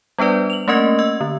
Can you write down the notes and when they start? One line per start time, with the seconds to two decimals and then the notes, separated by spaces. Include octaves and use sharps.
0.18 G3 B3 D4 B4 D5
0.50 F7 F#7
0.68 A3 A#3 C#4 A#4 D#5
0.99 D#5 E6
1.21 D3